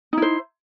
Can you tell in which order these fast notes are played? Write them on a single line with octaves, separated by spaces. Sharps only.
D#4 E4 C5